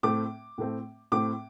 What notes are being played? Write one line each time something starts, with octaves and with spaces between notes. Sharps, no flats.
A2 A3 C4 D6
A2 A3 C4
A2 A3 C4 D6